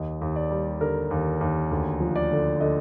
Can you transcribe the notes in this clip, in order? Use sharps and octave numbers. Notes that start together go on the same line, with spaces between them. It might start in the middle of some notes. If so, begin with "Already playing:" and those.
Already playing: D#2 D#5
D#2
D5
G3
D3 A#4
D#2
D#2
D2
F3
D5
D3
D3 D#5